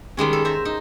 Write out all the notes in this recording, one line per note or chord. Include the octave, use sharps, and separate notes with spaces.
D#3 G3 G#3 C#4
A4
C5 E5 A#5
D#4